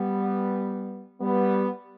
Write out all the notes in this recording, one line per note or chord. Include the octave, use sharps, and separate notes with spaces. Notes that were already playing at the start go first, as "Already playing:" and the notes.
Already playing: G3 B3
G3 B3